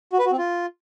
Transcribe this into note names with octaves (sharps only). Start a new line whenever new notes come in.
F#4
B4
F#4
C4
F4